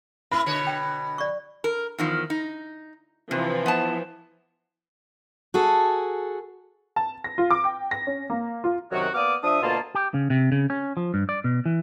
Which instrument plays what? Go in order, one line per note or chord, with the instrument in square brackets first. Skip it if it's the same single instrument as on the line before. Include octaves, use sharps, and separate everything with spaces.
[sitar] A#3 E4 [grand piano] B5
[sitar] B2 D3 C#5
[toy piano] G5
D5 C#6
[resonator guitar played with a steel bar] A#4
E2 D#3 F3
D#4
[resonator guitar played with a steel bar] C3 [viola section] E3 F3
[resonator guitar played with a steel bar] B3 A5
[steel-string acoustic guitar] F#4 G#4 A4
[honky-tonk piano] A5
A#6
F4
D6
G5
A#6
C#4
A#3
F4
[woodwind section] F#2 C3 D#3 F#3 F#4
A#3 B3 D5 D6 D#6 F6
F3 D4 E5 D#6
D2 B2 A#3 F4 A5
[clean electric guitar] G4
C#3
C3
C#3
C#4
F3
G2
D5
B2
E3